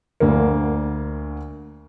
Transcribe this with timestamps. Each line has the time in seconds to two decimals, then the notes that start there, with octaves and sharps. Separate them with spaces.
0.20 D2 D3 A#3